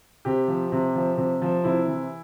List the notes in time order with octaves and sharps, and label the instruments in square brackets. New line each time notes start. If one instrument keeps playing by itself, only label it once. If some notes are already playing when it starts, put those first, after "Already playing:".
[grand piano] C3 G4
F3
C3
F3
C3
F3
C3 E4
E3